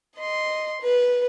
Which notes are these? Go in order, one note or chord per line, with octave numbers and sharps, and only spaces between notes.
D#5 C6
B4